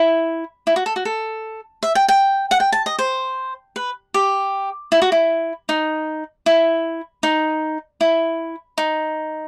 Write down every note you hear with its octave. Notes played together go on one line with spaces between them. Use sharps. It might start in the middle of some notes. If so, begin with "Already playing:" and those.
Already playing: E4
E4
F#4
A4
F#4
A4
E5
G5
G5
F#5
G5
A5
D#5
C5
B4
G4
E4
F#4
E4
D#4
E4
D#4
E4
D#4